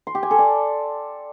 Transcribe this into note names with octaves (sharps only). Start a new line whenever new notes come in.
C6
G4
G#5
A4
D5